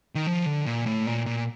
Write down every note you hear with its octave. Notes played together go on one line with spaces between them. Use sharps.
D#3
F3
D3
A#2
A2
A#2
A#2